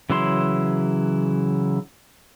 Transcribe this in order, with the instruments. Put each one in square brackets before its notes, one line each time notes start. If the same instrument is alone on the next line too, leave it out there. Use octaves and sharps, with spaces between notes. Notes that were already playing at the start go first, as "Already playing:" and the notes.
[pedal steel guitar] C#3 E3 F#3 E4 C6